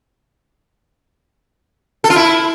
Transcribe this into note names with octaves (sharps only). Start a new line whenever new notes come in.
A4
F4
E4